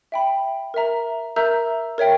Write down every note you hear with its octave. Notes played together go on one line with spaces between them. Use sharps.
E5 G5 B5
A#4 E5 A#5
A#4 E5 A#5 E6 G6
A#4 C#5 E5 G5